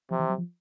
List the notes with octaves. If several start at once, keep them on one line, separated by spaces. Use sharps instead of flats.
C3 F3
E3
F#3
F3